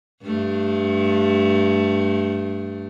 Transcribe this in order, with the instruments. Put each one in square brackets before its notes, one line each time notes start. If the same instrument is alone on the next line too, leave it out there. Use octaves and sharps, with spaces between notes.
[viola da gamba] G2 A3